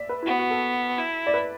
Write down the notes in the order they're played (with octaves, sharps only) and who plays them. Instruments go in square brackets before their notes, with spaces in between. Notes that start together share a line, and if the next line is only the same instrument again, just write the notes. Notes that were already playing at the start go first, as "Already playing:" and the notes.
Already playing: [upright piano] D5 E5
B4
E4
[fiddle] B3 [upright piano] F#4
[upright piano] F#4
A4
[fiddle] E4
[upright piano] D5
B4